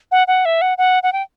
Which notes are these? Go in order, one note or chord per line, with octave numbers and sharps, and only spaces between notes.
F#5
F#5
E5
F#5
F#5
F#5
G5